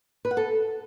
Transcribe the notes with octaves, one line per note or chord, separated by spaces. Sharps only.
B4
F#5
A4